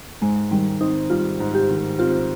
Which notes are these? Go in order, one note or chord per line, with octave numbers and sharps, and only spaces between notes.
G#2 G#3
D#3 G3
C4 D#4
G3 F4
G#2
G4
D#3
C4 F4